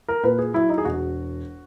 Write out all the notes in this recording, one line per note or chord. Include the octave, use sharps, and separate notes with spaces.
A#4
A#2 B4
G#4
F#3 E4
D#4
G#4
E1 F#4